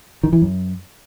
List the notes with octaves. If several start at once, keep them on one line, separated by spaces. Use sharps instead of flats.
D#3
E3
F#2